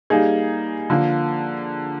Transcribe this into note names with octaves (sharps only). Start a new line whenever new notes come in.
G3 A#3 D#4 G#4
D3 F3 A#3